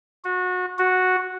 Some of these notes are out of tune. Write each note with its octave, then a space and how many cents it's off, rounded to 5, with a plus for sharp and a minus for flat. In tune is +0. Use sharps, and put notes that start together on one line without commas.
F#4 -25
F#4 -5